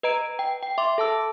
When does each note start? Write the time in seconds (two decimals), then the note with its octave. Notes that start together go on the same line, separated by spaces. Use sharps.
0.03 B4 D#5 A#5 D7
0.39 G5
0.63 G5
0.78 E5 C6 D6
0.98 A4 A5 E6